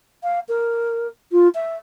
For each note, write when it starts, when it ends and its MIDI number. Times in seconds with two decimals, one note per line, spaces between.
0.23 0.39 77
0.48 1.07 70
1.32 1.48 65
1.54 1.76 76